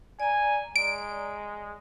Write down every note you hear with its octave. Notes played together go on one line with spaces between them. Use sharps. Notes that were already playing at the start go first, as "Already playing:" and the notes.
D5 G#5 A#5
G#3 D7